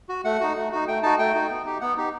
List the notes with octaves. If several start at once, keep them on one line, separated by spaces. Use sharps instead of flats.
F#4
A3 F#5
D#4 F#4
A3
D#4 F#4
A3 G5
D#4 F#4 A5
A3 G5
D#4 F#4
B3
D#4 G4
B3 F#5
D#4 G4